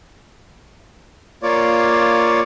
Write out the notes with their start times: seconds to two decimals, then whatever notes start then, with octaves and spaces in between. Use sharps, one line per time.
1.43 A#3 F4 C#5 D5